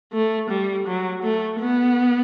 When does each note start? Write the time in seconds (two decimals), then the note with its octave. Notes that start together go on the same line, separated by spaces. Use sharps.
0.13 A3
0.50 G3
0.87 F#3
1.23 A3
1.60 B3